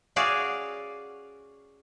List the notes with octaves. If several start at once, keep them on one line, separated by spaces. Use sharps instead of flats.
C#4 F#4 G#4 D5 F5